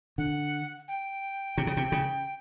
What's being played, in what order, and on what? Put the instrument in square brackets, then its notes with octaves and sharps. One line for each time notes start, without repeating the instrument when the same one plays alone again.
[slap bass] D3 [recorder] F#5
[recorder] G5
[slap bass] C3
C#3
C3
C#3